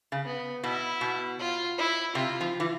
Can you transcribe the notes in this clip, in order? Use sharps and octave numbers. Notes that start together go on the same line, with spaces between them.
C#3
B3
B2 E4
B2
F4
E4
C3 F4
F3
E3